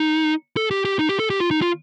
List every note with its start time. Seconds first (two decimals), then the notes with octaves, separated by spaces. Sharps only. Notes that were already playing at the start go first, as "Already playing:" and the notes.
Already playing: D#4
0.57 A4
0.71 G4
0.85 G4
0.99 D#4
1.09 G4
1.19 A4
1.30 G4
1.40 F4
1.51 D#4
1.62 F4